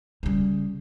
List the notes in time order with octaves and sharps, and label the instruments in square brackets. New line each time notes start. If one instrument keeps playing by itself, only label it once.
[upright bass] C#3 G3